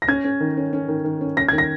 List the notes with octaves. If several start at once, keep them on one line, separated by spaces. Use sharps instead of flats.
A#6
C#4 G#6
C#4
D#3
C#4
C#4
D#3
D#3
C#4
C#4 A#6
D#3 G#6
A#6